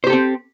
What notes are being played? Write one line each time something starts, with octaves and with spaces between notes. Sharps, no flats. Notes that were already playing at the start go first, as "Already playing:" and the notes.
C4 G4 A4 C5